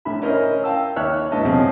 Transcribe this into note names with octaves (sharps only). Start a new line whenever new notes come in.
A1 D3 E5 B5
C#4 E4 A#4 C5 D#5 E5
F5 G5 A5 E6
D#2 C#5 E5 F6 F#6
D2 G2 B3 E4 D#5 A5
E2 B2 F3 G#3 C4 C#4